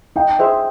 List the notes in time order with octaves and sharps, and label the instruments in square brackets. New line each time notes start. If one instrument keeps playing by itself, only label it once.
[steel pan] D#4 [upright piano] G5
[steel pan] G#4 C5 E5